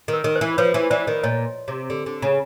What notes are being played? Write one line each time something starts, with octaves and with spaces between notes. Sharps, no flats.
D#3
A#4
D#3
C5
E3
F3 B4 C#5
E3
E3 C5 D5
D#3
A#2 C#5 D#5
C3
D3
D3
C#3